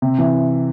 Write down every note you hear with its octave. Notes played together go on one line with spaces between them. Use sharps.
C3
E3